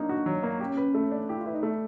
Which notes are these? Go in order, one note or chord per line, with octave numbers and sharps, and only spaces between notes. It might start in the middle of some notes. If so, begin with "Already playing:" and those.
Already playing: F#3 A#3 D4 D#4
F#4
F#3
A#3
C#4 G4
B4
A3
D4
E4 G4
F4
E4 B4
D#4
A3